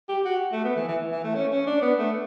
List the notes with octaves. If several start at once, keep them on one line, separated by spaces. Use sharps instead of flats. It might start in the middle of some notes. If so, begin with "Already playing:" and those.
G4
F#4
A3
B3
E3
E3
E3
A3
C#4
C#4
D4
B3
A3